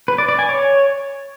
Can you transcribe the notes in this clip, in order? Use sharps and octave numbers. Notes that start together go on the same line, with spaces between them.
B4
D5
D5
G#5
C#5